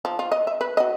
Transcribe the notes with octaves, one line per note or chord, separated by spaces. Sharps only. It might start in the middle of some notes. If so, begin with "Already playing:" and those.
F3
F4
D#5
E5
B4
F#4 D#5